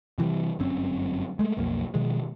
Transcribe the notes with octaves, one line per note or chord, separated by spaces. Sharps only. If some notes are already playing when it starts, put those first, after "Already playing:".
C3 E3 F3 G3
G1 F#2 C4 C#4
G#3 A3
B1 F2 A#3
B2 D#3 F3 G#3